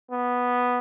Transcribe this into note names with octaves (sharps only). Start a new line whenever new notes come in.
B3